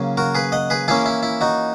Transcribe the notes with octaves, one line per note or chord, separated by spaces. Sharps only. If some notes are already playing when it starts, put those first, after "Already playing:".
Already playing: C#3 F#3 A#3 C#4
F#4 A#4
G#4 B4
D#5 F#5
G#4 B4
E3 A#3 C#4 E4 G#4
E4
E4
D#4 F#4